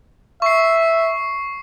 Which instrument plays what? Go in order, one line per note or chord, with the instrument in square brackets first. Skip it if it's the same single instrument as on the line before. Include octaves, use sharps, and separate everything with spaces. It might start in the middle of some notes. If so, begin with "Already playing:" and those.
[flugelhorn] E5 [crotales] C#6 C7